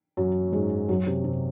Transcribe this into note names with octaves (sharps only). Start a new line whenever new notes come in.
F#2 F#3
G#2 G#3
F#2 F#3
C3
C3